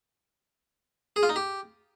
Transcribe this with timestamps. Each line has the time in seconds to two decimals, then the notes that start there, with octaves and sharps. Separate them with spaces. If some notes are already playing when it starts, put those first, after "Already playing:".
1.16 G#4
1.23 F4
1.29 D#4
1.36 G4